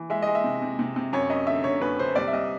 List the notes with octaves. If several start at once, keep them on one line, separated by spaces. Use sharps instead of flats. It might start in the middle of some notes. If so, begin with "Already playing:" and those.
Already playing: E3
G#3 E5
G#3 D#5
E5
C3
C3
C3
C3
F#2 C#5
F#2 D#5
D3 E5
D3 C#5
F#2 B4
D3 C5
C2 D5
E5
C2 D#5